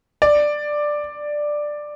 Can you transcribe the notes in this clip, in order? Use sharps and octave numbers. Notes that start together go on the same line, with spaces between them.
D5